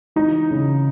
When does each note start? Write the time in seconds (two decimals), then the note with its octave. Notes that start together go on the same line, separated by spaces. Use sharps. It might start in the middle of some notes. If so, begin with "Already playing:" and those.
0.16 E3 D#4
0.51 C#3